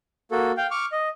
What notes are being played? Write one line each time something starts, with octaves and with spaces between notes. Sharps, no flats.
A#3 F#4 A4
F5 G5
C#6 D6 F6
D#5